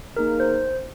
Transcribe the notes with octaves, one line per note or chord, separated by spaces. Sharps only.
A#3 D#4 G#4 A#4
C5